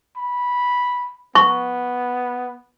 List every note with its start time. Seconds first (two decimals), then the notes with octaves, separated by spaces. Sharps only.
0.17 B5
1.35 B3 C#6